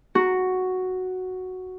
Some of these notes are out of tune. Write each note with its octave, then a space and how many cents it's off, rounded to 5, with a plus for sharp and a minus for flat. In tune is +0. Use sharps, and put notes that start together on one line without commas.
F#4 +0